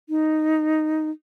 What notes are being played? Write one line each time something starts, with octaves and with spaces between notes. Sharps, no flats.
D#4